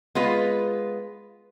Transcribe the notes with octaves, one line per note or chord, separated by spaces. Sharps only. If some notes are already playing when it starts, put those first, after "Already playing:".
G#3 B3 F4 B4